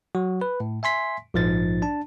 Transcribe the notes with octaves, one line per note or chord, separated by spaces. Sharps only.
F#3 F#4
B4
A2
E5 G#5 C6 B6
A#1 G#2 F3 D#4 A6
D4 A5